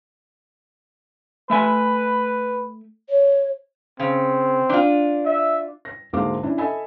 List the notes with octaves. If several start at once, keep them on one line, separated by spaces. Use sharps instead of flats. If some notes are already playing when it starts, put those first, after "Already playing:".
A3 B4 E5 G#5
C#5
C#3 C4
D4 F4
E5
A#6
D2 G#2 G#3 A#3 F5 D6
C#4 D4 E4
A4 D#5 E5 G#5 B5